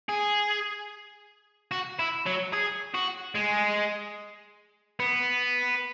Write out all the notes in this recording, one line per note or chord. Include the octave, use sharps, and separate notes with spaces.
G#4
F#4
E4
F#3
G#4
F#4
G#3
B3